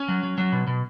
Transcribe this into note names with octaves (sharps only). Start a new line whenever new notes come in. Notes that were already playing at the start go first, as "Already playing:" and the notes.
Already playing: C#4
F#3
F#3
F#3
B2
B2